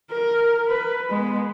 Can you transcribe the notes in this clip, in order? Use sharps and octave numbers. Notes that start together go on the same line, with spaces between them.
A#4
B4
G#3 B3